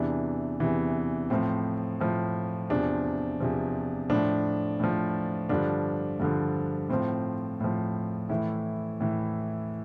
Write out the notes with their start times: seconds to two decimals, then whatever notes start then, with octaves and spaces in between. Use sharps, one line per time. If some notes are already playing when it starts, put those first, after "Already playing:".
Already playing: E2 C3 E3 D4
0.60 E2 C3 E3
1.30 A2 F3 C4
2.00 A2 F3
2.70 E2 C3 F3 D4
3.40 E2 C3 F3
4.10 A2 F3 D4
4.80 A2 F3
5.49 G2 D3 F3 D4
6.20 G2 D3 F3
6.89 A2 F3 C4
7.60 A2 F3
8.29 A2 E3 E4
9.00 A2 E3